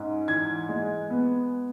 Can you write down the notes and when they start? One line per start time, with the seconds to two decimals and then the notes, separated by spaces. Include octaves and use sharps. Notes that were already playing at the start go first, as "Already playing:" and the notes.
Already playing: G#2 C#4
0.28 E3 G#6
0.69 G#3
1.10 B3